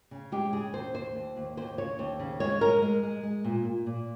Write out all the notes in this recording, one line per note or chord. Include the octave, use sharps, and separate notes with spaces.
C#3
G#3 G4
C#3 G#4
D#2 C5
D#2 C5
D#2
D#2
D#2 C5
C#3 C#5
D#2 C5
C#3
G#3 C#5
G#3 A#4
G#3 A#4
G#3
G#3
A#2
A#2
A#2